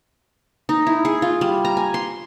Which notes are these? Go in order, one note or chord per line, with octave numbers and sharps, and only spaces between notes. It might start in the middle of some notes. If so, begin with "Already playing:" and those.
D#4
E4
G#4
F4
G3
A#5
G#5
C6